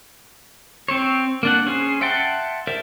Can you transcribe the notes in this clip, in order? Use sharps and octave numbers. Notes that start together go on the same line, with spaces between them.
C4 C5 C#5
A#3 D4 F#5
C#4 G#4 C5
E5 F#5 G5 A5 C6
A#4 C5 D5 E5